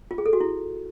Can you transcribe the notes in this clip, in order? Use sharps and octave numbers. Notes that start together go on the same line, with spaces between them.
F4
G#4
A4
F#4
E4